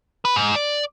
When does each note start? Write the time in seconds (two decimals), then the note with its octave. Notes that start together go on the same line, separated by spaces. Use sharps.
0.25 B4
0.36 G#2
0.55 D5